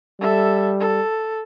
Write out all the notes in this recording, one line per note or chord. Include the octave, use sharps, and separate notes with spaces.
G3 A4 E5
A4